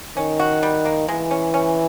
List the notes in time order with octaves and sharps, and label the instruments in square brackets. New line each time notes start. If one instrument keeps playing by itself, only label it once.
[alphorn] D#3 [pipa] C#4
[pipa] F#4
G3
A#3
[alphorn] E3 [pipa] G#3
[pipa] C#4
C#4